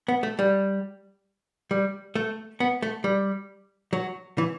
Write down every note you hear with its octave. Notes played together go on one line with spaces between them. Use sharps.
B3
A3
G3
G3
A3
B3
A3
G3
F#3
E3